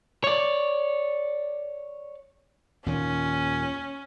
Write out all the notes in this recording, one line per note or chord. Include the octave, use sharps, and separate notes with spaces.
C#5 D5
D#2 A#2 D#3 C#4